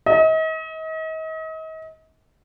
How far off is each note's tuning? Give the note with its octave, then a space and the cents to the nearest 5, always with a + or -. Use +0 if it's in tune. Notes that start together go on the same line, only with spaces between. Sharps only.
D#5 +40